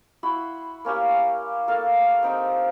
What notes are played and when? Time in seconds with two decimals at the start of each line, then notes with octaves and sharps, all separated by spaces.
0.23 E4 F#4 B5 C6
0.85 A#3 C#4 G4
1.68 A#3 A4 F5
2.23 C4 D#4 G5